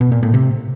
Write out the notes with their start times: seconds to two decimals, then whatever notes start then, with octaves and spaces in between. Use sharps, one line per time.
0.01 B2
0.12 A#2
0.23 A2
0.34 C3